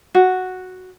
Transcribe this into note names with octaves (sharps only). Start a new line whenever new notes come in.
F#4